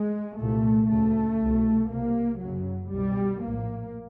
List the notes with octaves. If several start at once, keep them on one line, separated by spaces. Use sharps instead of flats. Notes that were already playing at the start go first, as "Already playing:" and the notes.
Already playing: G#3
C2 A#2 A3
D2 C#3 A3
C2 B2
C2 C3 A#3
F#1 F#2 C#3 F#3
C2 B2 G3
A#1 A2 A#3